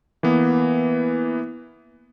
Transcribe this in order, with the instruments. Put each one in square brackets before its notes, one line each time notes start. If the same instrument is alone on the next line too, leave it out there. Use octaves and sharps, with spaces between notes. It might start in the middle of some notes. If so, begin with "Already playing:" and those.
[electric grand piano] E3 A#3 B3